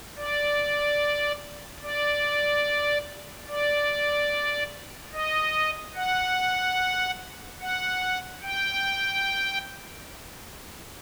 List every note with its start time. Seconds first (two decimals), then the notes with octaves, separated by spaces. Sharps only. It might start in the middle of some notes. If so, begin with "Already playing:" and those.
0.17 D5
1.82 D5
3.48 D5
5.13 D#5
5.95 F#5
7.61 F#5
8.43 G5